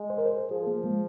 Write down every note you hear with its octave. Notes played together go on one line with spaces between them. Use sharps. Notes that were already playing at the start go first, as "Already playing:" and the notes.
Already playing: G#3
C5
A#4
C5
F3 G#4
A#3
G#3